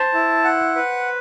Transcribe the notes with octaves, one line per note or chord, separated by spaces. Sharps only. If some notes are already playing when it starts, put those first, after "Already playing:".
Already playing: C5 A5
E4
F#5
B4